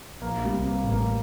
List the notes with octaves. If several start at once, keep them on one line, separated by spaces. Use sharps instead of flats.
A#1 A#2 A#3
G3
C2 C3
A#3
A1 A2
A#3